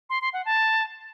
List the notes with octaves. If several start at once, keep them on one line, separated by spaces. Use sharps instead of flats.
C6
C6
F#5
A5